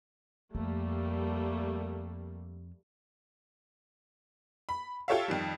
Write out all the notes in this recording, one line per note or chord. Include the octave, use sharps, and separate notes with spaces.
F2 G3 A3 A#3
B5
F4 G4 A4 C#5 E5 F5
F2 D#3 G3